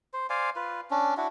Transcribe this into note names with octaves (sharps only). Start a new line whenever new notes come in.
C5
C5 D5 F5 G#5
F4 B4
C#4 D4
D4 E4 F#4